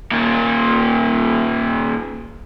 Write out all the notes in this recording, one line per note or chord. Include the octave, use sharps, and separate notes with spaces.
A#2 D#3